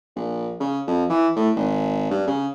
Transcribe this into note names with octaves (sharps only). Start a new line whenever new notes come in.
A#1
C#3
F2
E3
A2
G#1
G2
C#3